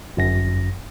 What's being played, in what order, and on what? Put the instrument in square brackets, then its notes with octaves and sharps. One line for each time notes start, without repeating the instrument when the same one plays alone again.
[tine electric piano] G1 F#2 A#6